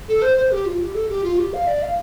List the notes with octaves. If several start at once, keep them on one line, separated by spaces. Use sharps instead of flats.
A4
C5
C5
G4
F4
G4
A4
G4
F4
G4
F5
D5
F5